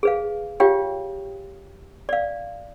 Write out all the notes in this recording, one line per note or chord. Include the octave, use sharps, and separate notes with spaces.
G#4 B4 F5
F4 G4 C#5 F5 G5
D5 F5